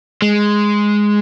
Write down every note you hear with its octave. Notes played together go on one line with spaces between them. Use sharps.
G#3